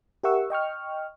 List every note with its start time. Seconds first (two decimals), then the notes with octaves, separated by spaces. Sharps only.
0.23 G4 A#4 E5 F#5 C#6 E6
0.50 D#5 G5 C#6 F6